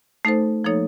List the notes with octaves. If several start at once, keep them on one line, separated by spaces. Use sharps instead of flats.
A3 D#4 A4 C5
F3 A#3 D#4 A4 C#5